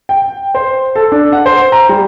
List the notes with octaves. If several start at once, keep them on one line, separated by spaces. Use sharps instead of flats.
G5
C5
A4
D4
F#5
C5
A#5
G3